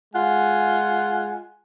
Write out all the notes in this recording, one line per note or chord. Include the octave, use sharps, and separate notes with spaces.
G#3 F4 F#5 G#5